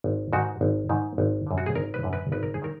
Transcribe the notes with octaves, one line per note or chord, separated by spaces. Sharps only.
G#1
G#2 D#3 F#4
G#1
G#2 D#3
G#1
F#2 D3
F#4
G#4
G#1 A#4
B4
F#2 D3
B4
G#1 B4
A#4
G#4
D#3 A#4